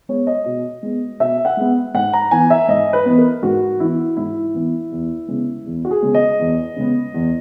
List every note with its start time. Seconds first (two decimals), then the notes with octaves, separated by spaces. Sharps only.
0.09 G#3 B3 C#5
0.27 D#5
0.45 B2
0.83 G#3 B3
1.20 B2 E5
1.45 F#5
1.57 G#3 B3
1.94 G#2 F#5
2.13 A#5
2.31 E3 B3 G#5
2.50 E5
2.68 G#2 D#5
2.93 B4
3.06 E3 B3
3.18 A#4
3.43 G#2 F#4
3.80 E3 B3 E4
4.17 G#2 E4
4.54 E3 B3
4.91 E2
5.28 C#3 G#3 B3
5.66 E2
5.85 F#4
5.91 G#4
6.02 C#3 G#3 B3
6.14 D#5
6.39 E2
6.76 C#3 G#3 B3
7.14 E2